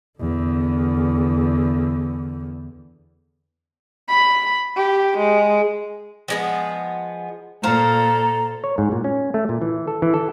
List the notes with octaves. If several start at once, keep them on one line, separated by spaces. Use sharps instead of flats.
E2 D3
B5
G4
G#3
F3 G#3 B3
A#2 A4 C5 F5 A#5
C#5
G#2
A#2
C#4
A3
A#2
E3
A4
E3
A4